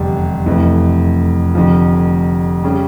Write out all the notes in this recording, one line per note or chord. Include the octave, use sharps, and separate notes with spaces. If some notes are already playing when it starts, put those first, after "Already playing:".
Already playing: F1 E2 D3 G3 D4
F1 F2 E3 A3
F1 F2 D3 F3
C#3 G3 C#4